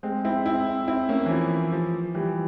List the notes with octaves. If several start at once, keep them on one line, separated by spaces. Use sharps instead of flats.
G#3 C4
C4 E4
C4 E4
C4 E4
A#3 C#4
E3
F3
F3
E3 G3